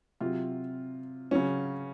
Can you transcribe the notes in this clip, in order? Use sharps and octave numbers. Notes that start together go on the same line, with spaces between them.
C3 F#3 F4
C#3 F#3 C#4